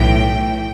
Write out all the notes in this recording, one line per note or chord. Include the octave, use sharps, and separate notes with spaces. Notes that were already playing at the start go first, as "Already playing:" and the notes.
Already playing: B1 A2 E3 G5